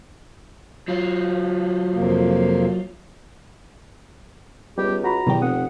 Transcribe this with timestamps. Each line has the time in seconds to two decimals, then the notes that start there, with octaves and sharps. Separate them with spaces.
0.88 F#3 F4
1.94 F2 C3 A#3
4.78 C#2 G3 B3 G4
5.04 F#4 A#5 B5
5.27 E2 B2 D#3 F#3 G4
5.42 F1 F#5 D#6